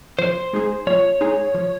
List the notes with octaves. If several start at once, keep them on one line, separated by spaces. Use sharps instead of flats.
F3 C5
G#3 D#4 G#4
F3 C#5
G#3 D#4 G#4
F3